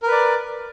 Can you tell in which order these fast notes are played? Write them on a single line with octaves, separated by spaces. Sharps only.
A#4 B4 D5